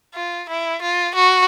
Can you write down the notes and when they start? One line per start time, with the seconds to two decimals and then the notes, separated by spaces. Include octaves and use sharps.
0.15 F4
0.49 E4
0.82 F4
1.15 F#4